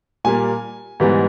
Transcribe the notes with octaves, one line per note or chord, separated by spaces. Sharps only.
A#2 G3 A#3 G#5
G#2 E3 G3 B3